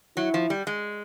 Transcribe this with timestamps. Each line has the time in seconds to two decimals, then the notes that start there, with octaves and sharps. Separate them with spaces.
0.17 F#3 E4
0.34 F3
0.50 G3
0.67 G#3